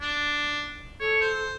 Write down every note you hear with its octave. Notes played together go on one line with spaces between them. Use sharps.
D4
A4 C#5
C5